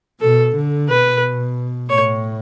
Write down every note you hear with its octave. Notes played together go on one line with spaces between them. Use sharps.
B2 A4
D3
B2 B4
A2 C#5